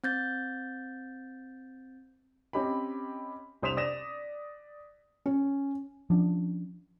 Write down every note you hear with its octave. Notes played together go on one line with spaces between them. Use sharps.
C4 G6 A6
C4 C#4 G4 D#5 B5
C2 C5 D#6 B6 E7 F7
D5 D#6 A#6 E7
C#4
F3 C#4 D4